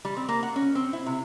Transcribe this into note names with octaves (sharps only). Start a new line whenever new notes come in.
G3
C4
A#3
F#5
C#4
C4
E4
C3